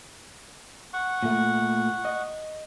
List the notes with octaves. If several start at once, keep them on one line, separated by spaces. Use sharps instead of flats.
F#5 C#6
A#2 A3
D#5